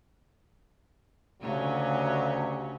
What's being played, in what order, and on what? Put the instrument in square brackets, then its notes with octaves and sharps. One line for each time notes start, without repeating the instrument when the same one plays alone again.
[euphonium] D2 [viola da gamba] C#3 C#4 [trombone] F#3 [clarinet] G4